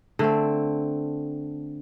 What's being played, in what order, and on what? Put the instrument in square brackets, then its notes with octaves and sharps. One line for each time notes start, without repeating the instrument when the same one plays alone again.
[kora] D3 A3 C4